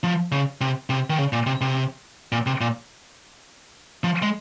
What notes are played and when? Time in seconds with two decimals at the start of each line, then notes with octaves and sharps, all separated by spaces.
0.03 F3
0.32 C#3
0.61 C3
0.90 C3
1.10 D#3
1.18 C#3
1.33 A#2
1.46 C3
1.61 C3
2.32 A#2
2.46 C3
2.61 A#2
4.04 F3
4.23 G#3